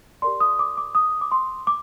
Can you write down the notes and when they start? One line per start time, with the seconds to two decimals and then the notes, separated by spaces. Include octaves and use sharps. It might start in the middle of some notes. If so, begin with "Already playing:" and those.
0.22 G4 A#4 D5 C6
0.40 D#6
0.59 D6
0.78 D6
0.95 D#6
1.21 D6
1.32 C6
1.67 D6